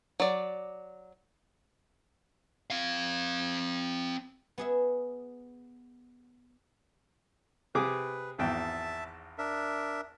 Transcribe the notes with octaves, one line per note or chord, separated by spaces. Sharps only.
F#3 D5
C4 F5
B3 G#4 E5
C3 G#4 B4 D6
G#1 E2 E5 G5 A5
D4 A#4 E5